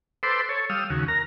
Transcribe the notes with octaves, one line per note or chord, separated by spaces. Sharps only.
A4 B4 C5 C6 D6 E6
A4 C#5
G3 F5 D#6 E6
D#2 C#3 F#4
A#4 A#5